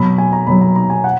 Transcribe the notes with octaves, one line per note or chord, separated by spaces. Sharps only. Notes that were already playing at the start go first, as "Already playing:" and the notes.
Already playing: B2 F#3 B5
G#5
A#5
B2 F#3 B5
A#5
A#5
G#5
F#5